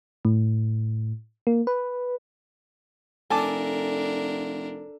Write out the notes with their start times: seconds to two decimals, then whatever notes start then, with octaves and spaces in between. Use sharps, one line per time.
0.25 A2
1.47 A#3
1.67 B4
3.30 F1 D4 A4 A#4 G#5 A5 D6